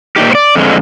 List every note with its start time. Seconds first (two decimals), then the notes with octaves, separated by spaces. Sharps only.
0.16 A#2 C#3 D#4 G4
0.31 C5 D5
0.55 F2 D3 G#3